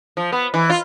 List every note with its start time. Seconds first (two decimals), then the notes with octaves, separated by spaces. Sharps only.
0.17 F3
0.32 B3
0.54 E3
0.70 F4